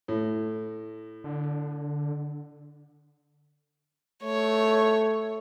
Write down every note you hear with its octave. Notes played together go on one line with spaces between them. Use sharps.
A2
D3
A3 C#5